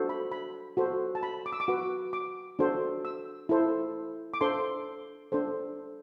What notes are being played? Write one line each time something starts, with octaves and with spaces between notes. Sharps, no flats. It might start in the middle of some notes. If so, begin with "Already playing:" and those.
Already playing: D4 F#4 A4 C5
B5
B5
F#4 A4 C5
A5
B5
D6
E6
D6
F#4 B4
D6
D4 F#4 A4 C5
E6
E4 A4 C5
D6
D4 A4 C5 C6
D4 A4 C5